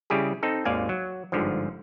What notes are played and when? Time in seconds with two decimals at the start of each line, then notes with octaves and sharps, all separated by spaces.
0.10 C#3 G3 E4 G4 G#4
0.43 C4 D#4 A4
0.65 G#1 D#2 D5 F5 G#5
0.89 F#3
1.32 G1 G#2 D3 F3